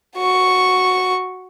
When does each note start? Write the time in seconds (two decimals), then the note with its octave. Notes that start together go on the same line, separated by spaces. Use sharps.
0.17 F#4 C#6